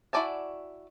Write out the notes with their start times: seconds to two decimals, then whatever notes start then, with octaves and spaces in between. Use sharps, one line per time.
0.13 E4 F#4 D5 G#5 A5